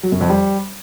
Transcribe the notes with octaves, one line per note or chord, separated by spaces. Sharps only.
F#3
F#2
F2
G3